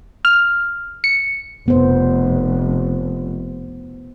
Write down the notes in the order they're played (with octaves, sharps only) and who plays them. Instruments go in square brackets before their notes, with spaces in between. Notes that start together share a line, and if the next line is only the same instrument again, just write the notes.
[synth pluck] F6
C#7
[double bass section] F1 [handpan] B3 C5